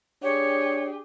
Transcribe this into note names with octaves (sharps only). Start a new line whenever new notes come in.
D4 G4 G#4 C#5